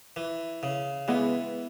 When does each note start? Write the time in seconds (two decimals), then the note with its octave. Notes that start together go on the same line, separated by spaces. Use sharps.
0.16 E3
0.63 C#3
1.08 E3 G#3 B3